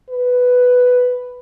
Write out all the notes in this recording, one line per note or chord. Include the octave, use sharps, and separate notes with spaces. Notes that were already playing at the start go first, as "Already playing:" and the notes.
B4